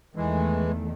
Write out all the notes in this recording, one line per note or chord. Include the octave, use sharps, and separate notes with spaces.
E2 D#3 E3 G#3 A3